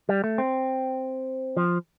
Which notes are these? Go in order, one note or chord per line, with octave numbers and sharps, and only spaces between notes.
G3
A3
C4
F3